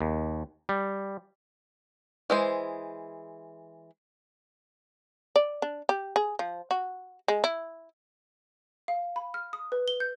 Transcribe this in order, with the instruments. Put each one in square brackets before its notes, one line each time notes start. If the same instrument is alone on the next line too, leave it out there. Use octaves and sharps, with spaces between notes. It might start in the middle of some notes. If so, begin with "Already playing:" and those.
[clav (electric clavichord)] D#2
G3
[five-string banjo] E3 G#3 C5
[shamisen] D5
D4
G4
G#4
F3
F#4
G#3
E4
[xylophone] F5
B5
F6
D#6
B4
G7
G6